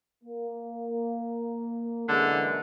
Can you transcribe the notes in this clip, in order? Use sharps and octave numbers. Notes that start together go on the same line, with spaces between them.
A#3
F#2 D3 E3 G#3